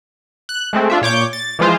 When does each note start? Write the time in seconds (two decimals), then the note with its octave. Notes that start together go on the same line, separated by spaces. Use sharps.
0.49 F#6
0.73 G#3 A3 C4
0.90 D4 F4 E5
1.01 A#2 C#5 D6 G6
1.33 A6
1.59 E3 F3 G#3 F4 C5